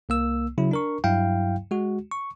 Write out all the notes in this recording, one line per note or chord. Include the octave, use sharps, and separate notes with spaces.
C2 A#3 E6
C#3 F#3 E4
D4 A#4 C#6
G2 F#3 E4 F5 G5
G#3 F#4
C#6